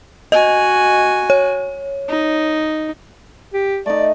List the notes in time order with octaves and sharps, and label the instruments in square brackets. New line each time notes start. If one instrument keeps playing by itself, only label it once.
[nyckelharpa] F#4 G#5 [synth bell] D#5
[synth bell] C#5
[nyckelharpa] D#4
[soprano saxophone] G4
[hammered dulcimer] A3 D#4 [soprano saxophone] D5